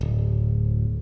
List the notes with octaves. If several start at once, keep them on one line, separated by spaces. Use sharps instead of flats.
D1